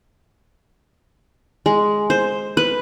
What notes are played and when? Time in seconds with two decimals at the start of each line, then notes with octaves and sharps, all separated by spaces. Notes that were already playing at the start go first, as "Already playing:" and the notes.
1.66 G#3
2.10 C5
2.57 B4